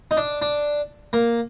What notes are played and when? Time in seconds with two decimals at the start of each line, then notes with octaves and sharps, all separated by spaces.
0.11 D#4
0.17 D4
0.42 D4
1.13 A#3